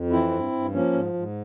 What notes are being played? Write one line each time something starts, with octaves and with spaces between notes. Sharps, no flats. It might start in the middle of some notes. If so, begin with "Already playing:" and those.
Already playing: F2
E3 C4 E4
G2
G2
F3 A#3 C#4
G#2
G#2